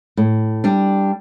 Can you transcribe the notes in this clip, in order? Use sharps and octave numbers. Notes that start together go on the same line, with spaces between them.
A2
G3 D4